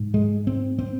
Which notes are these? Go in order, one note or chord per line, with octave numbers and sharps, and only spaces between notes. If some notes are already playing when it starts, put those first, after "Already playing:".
Already playing: G#2
G#3
C4
C4